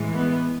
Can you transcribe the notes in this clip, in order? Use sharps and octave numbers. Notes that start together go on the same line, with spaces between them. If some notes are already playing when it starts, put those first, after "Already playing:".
Already playing: A2 E3 G#3
B3